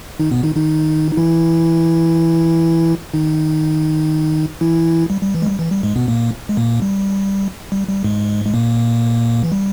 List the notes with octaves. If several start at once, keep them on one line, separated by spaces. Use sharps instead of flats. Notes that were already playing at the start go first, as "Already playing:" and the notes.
D#3 D#4
B2 B3
D#3 D#4
D#3 D#4
D#4
E3 E4
D#3 D#4
E3 E4
G3
G3
E3
G#3
G3
E3
G3
G#2 G#3
B2 B3
A#2 A#3
G#3
A#2 A#3
G3
G3
G3
G#2 G#3
G#3
A#2 A#3
E3
G3